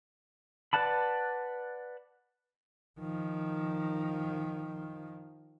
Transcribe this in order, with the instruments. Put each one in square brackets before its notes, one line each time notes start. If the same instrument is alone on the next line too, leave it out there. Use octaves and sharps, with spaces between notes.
[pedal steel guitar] B4 D5 F#5 A5 B5
[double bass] D#3 F3